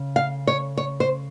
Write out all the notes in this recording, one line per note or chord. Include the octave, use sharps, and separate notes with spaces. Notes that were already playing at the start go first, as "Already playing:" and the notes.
Already playing: C#3
F5
C#5
C#5
C5